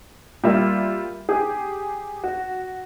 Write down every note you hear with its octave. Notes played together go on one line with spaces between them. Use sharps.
G3 A#3 F4 E5
G4 G#4
F#4